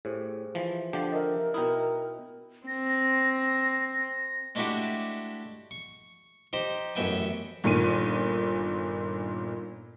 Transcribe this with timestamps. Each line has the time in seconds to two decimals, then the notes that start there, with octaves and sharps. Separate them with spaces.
0.05 A2 G4 G#4 C5
0.55 E3 F3
0.93 D3 F3 G4
1.12 A#4 D#5 E5
1.54 B2 D#4 E4 G5 D#6
2.67 C4 A#6
4.55 G#3 A3 D4 E4 F#4 G4
5.71 C#6
6.53 D#4 G4 C5
6.95 A1 F#2 B3 E5 G5 G#5
7.64 G1 A#2 D#3 D#7